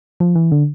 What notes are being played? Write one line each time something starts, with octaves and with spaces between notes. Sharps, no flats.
F3
E3
D3